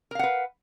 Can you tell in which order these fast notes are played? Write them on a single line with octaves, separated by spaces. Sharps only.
A#4 F5 F#5 B4